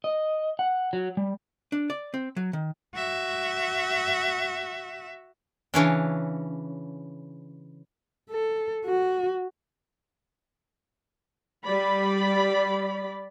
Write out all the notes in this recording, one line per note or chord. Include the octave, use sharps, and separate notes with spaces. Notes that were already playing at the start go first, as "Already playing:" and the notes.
D#5
F#5
F#3
G3
D4
D5
C4
F#3
D#3
F#4 E5
C#3 E3 C#4 D4
A4
F#4
G3 D5 B5